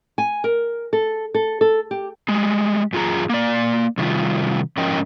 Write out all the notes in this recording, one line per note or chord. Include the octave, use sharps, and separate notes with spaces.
G#5
A#4
A4
A4
A4
G4
G3 G#3
F#2 F4 G#4 A#5
A#3 D5
C3 D#3 G3 F4
G#2 F3 C#4 A#4 D#5 G5